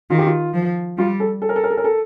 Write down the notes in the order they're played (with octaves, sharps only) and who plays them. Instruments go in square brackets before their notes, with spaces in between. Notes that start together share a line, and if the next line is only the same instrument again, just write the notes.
[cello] D#3 [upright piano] F4
[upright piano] G4
F4
[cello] F3
[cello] G3 [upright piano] F4
[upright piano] A4
A4
A#4
A4
A#4
A4
A#4
A4